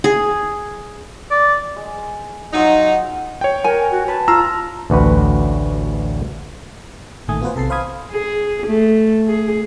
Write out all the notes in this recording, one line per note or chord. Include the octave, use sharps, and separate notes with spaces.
G#4
D5
G#3
F#3 D#4 F4 C5 F#5
C#5 G5
A#4 G#5
F#4
B4 A5
F4 A#5 E6
A1 D2 F#4 B4
A1 A#2 D#3 A3 G#5 D#6
B3 F4 F#4 B4 C5
B1 C3 A4 A5 C7
C5 F5 B5 D#6 G#6
G#4
A3
G#4